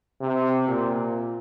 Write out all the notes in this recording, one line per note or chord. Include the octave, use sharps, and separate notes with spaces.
C3
A#2